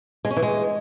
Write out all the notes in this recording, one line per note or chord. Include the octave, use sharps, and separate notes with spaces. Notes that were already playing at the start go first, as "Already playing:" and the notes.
G#3
C#4
E3
G#3